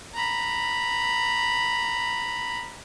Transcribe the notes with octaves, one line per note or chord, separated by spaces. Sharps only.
A#5 B5